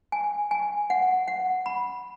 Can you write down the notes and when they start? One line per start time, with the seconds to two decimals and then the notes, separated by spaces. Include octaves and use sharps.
0.12 G#5
0.51 G#5
0.90 F#5
1.28 F#5
1.66 B5